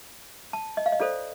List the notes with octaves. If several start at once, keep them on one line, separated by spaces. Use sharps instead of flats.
A5
D#5
F5
D#5
F4 A4 C5 D5